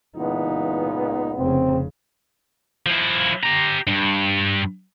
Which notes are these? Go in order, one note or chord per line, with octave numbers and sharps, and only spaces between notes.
C#2 A#2 E3 B3 D#4
F1 C#3 C4
F3 E4
G4 A#5
G2